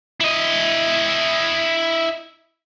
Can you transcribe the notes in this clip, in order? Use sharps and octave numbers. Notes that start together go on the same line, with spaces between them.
E4 D#5